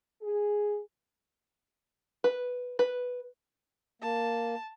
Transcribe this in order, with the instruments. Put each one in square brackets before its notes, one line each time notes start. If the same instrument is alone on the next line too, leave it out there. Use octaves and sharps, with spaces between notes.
[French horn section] G#4
[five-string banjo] B4
B4
[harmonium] A#3 [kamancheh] A5